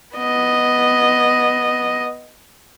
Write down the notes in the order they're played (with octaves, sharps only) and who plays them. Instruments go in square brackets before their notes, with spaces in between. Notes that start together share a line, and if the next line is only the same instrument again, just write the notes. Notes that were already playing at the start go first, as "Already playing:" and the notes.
[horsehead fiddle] B3 D#5